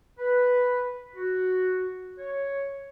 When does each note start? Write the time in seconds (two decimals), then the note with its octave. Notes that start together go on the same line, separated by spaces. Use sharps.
0.19 B4
1.15 F#4
2.18 C#5